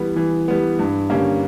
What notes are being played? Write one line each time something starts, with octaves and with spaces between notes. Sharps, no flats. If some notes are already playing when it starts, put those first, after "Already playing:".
Already playing: E3 G3 B3
E3
G3 B3
G2
D3 G3 A#3 C#4